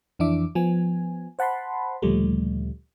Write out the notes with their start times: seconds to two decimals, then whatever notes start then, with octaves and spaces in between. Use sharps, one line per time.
0.19 F2 E3 D4 E5 D6
0.55 F3 B3 G#5
1.39 C5 F#5 A5 B5 C6
2.02 D2 A#2 C#3 F3 G3 A3